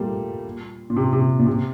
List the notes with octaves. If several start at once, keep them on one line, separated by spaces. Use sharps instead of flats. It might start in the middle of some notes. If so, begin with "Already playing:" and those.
Already playing: A#2 G3 A3 A#3
A#2
C3
C3
A#2
C3